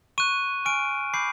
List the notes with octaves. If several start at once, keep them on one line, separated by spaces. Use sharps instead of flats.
C#6 F#6 D#7
G#5 C#6 F6 D7
B5 D6 G6 C7